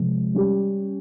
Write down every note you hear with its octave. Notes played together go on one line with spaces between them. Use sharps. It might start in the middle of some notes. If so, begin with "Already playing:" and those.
Already playing: C3 F3 G#3
G3 C#4 G4